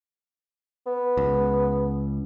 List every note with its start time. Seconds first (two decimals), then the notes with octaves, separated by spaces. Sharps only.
0.86 B3
1.17 C#2